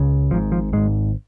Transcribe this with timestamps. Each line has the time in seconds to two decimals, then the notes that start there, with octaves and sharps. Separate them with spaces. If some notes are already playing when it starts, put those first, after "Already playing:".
Already playing: C#2 C#3
0.31 G#1 G#2 F3
0.52 F3
0.73 G#1 G#2 G#3